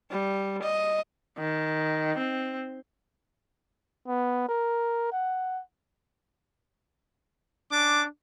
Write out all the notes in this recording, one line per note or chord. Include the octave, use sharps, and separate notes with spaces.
G3
D#5
D#3
C4
B3
A#4
F#5
C#4 D4 D6